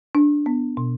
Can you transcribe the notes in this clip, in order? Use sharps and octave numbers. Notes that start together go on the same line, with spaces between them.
D4
B3
B2